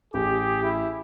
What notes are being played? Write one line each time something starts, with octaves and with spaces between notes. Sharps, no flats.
A1 G4 G#4
E4